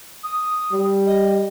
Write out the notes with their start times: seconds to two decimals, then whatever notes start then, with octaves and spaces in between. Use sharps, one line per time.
0.24 D#6
0.73 G3
1.06 D#5